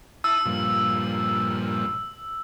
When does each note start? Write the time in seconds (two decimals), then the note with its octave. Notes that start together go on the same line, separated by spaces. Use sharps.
0.24 E4 A5 D#6 E6
0.45 G2 A#2 F3